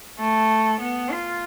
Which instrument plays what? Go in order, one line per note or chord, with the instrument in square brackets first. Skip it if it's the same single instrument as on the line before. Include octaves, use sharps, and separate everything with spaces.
[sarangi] A3
B3
F4